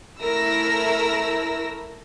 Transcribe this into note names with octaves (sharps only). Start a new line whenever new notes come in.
A3 E4 A#4 E6 A#6